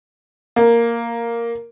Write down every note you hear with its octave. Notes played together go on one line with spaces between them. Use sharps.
A#3